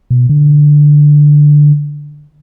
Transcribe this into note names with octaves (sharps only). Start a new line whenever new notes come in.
B2
D3